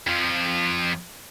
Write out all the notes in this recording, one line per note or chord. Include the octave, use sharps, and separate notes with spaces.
F2 F3